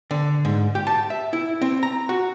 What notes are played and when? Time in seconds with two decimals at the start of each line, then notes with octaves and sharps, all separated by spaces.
0.11 D3
0.45 G#2
0.75 G4
0.87 A5
1.10 E5
1.33 E4
1.61 C4
1.83 A#5
2.09 F#4